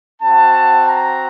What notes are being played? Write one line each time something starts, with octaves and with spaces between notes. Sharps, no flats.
C4 F#4 A5
A#5